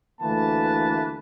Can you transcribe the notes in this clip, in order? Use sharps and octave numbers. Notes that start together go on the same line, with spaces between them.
D2 E3 A3 A#3 B4 A5